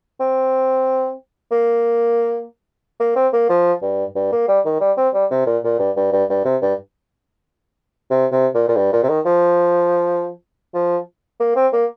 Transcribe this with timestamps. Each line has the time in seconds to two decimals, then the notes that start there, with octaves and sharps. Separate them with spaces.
0.20 C4
1.52 A#3
3.00 A#3
3.16 C4
3.33 A#3
3.50 F3
3.82 G2
4.16 G2
4.32 A#3
4.48 G3
4.65 D#3
4.80 G3
4.97 C4
5.14 G3
5.31 C3
5.47 A#2
5.64 A#2
5.79 G2
5.96 G2
6.12 G2
6.30 G2
6.45 C3
6.62 G2
8.11 C3
8.32 C3
8.55 A#2
8.68 A#2
8.76 G2
8.93 A#2
9.03 C3
9.09 D#3
9.26 F3
10.74 F3
11.40 A#3
11.56 C4
11.73 A#3